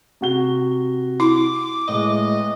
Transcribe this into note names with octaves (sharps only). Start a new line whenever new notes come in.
C3 F#4 G7
E4 D6
A2 G#3 B3 D#5